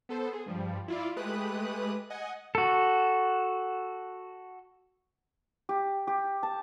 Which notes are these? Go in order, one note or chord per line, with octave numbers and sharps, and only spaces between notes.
B3 A4 C5
G#4
G2 F3 G3
E4 F4 D5
G#3 A3 G4 B4 D#6 F#6
D#5 F#5 G#5
F#4 A4
G4
G4
A5